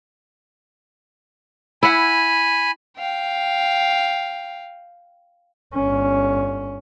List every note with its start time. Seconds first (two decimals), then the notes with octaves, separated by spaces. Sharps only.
1.83 E4 F#5 G#5 B5
2.97 F5 G5
5.74 G1 C#4